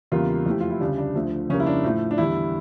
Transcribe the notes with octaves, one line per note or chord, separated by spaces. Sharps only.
E2 C#3 G3 A#3 F4
F2 E3 A3 G4
F4
E4
D2 C#3 G3 D4
D4
D2 D3 F3 A3
F2 C#3 G3 A#3 C#4
E4
D4
A2 F3 A3
D4
E2 D3 G3 E4